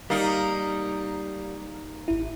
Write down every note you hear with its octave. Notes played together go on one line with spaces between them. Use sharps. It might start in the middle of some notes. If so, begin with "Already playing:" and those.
G3 A#3 D#4
G#1 E4